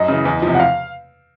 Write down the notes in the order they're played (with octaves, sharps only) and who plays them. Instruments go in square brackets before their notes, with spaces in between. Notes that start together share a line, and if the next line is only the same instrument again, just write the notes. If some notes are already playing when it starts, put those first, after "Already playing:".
Already playing: [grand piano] F#2 [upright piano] D#5
[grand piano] C#3 E3
E2
C3 F3
[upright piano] F#5
F5